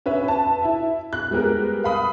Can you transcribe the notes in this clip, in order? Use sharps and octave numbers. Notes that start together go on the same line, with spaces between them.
C#4 B4 E5
B4 A5
E4 E5
F#6
G3 G#3 B3 G4 A#4
F5 B5 D#6